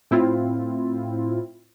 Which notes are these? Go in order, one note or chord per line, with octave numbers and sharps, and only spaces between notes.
A2 C4 E4 F4